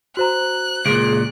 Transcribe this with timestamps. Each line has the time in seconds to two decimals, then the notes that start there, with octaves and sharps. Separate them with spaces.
0.17 F#4 C5 A#5 F#6
0.86 C#2 A#2 G#4 D7